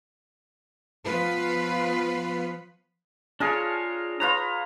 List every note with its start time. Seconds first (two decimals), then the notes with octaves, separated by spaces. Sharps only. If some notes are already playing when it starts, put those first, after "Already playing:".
1.05 F3 B3 F4 B4
3.40 D4 F4 G#4 A#4 C#5 A5
4.20 F4 B4 C#5 A#5